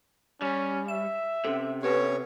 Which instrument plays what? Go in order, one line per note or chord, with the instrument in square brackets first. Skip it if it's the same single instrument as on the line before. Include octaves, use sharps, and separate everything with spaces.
[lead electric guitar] G3 [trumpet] C#4
[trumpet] E5 [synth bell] E7
[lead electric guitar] C3 [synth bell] C#4 A4
[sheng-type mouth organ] B3 C#4 C#5 [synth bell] G4 A4 B4